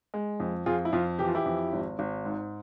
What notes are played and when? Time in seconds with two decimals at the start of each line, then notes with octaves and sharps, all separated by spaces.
0.14 G#3
0.40 F2
0.66 F2 F4 G#4
0.85 E4
0.93 F2 F4
1.19 E3 G4
1.28 F4
1.35 E4 G4
1.46 F2
1.73 G#1
1.99 G#1
2.25 G#2